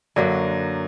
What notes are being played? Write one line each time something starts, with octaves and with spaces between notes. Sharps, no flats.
F#2 D3 F#3 A#3